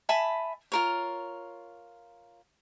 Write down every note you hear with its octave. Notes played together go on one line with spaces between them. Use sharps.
E5 G#5 A5 B5
F4 A#4 C#5